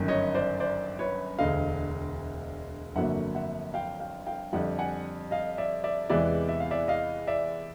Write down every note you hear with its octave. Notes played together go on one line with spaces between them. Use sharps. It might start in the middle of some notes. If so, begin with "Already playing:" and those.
Already playing: G1 F#2 D#3
C#5 D#5
C5 D5
C5 D5
B4 C#5
E1 D2 D3 D#5 F5
G1 F2 D3 F#3 A#3 E5 F#5
E5 F#5
F5 G5
F5 G5
F5 G5
F2 D3 G3 E5 F#5
F#5 G#5
D#5 F5
D5 E5
D5 E5
E2 C3 E3 G#3 B3 D5 E5
E5
F5
D5 E5
D#5 F5
D5 E5